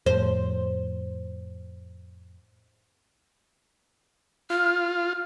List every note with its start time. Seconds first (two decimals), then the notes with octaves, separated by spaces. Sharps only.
0.06 F2 A2 C5
4.50 F4 F6